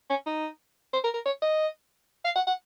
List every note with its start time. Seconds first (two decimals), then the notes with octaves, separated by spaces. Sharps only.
0.10 C#4
0.26 D#4
0.93 C5
1.04 A#4
1.14 A#4
1.25 C#5
1.42 D#5
2.25 F5
2.36 F#5
2.47 F#5